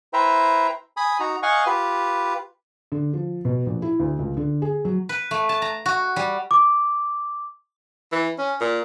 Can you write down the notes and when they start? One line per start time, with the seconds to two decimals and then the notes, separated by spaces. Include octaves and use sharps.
0.13 E4 B4 C5 E5 G5 A#5
0.97 G#5 B5 D#6
1.20 D#4 F#4 A#5
1.43 D#5 F5 F#5 G#5 C#6
1.66 F4 G4 B4
2.92 D3
3.13 F3
3.45 B2
3.66 A#1
3.82 E4
4.00 D2
4.19 C#2
4.37 D3
4.62 G#4
4.85 F#3
5.09 B4
5.31 A3
5.49 A5
5.62 A#5
5.86 F#4
6.16 G3
6.51 D6
8.12 E3
8.38 C#4
8.60 A#2